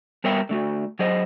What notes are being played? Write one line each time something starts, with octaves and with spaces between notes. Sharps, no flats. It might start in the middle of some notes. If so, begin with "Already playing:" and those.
G3 B3 A#4 C#5 E5 G5
D3 A3 F#4
F#3 G#4 C5 D#5